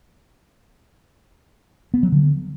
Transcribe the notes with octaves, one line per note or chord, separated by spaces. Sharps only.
B3
F#3
D3